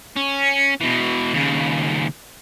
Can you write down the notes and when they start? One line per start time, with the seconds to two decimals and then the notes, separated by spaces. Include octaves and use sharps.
0.16 C#4
0.81 B2 E3
1.34 D#2 C#3